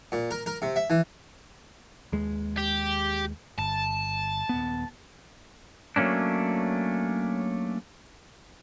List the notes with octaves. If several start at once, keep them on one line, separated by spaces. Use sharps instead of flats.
A#2
A#4
A#4
C3
E5
E3
D#2 G#3
G4
G1 A5
D#1 B3
F#3 A3 A#3 C#4 D4